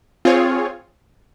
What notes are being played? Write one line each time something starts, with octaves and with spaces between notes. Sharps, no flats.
C4 F4 G#4 C#5